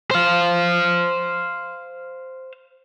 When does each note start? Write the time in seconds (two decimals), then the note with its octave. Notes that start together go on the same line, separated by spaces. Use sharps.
0.11 C5 F5